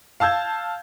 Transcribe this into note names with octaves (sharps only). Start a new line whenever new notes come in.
F5 A5 E6 G6 G#6